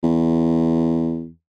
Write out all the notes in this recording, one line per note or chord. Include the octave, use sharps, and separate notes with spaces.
E2